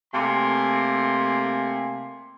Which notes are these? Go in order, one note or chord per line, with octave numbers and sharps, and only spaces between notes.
C3 A3 A#3 G#5 C6